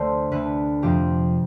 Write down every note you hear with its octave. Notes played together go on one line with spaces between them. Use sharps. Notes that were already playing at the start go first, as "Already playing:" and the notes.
Already playing: D2 D3 A3 C5
D2 D3 A3 B4
F2 C3 F3 A3 G4